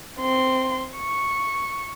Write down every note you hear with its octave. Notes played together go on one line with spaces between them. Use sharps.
C4 C6
C#6